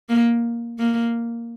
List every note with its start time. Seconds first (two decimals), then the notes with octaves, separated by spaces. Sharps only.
0.09 A#3
0.79 A#3